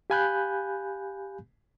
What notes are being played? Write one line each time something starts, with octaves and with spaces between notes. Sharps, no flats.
G4 F5 G#5 B5 F#6 G6